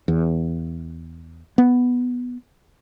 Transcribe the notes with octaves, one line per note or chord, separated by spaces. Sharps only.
E2
B3